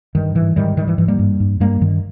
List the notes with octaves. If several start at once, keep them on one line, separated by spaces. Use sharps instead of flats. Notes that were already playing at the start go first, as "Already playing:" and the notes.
G2 D#3
G#2 E3
G#2 D#3 G3
G#2 D#3 G3
E3
G#2 E3
G3 A#3
G2
G2
G2 G3 A#3
G2 D#3